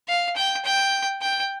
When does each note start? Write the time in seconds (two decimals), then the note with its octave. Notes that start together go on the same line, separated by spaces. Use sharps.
0.08 F5
0.36 G5
0.65 G5
1.22 G5